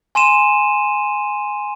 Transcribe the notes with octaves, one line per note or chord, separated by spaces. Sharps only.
G#5 C6 D#7 E7